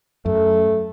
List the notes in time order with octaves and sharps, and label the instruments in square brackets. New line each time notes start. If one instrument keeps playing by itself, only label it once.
[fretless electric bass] F#2 [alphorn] A3